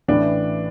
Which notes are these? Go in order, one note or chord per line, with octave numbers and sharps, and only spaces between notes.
A1 A2 E3 D4